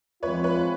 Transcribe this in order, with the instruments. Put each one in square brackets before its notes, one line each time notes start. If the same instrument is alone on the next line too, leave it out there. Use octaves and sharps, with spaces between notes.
[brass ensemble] F3 G#3 C4 F4 [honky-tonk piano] B4 C#5
[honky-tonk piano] B4 C#5